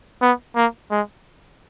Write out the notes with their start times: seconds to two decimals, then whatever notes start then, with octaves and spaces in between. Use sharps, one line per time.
0.22 B3
0.56 A#3
0.91 G#3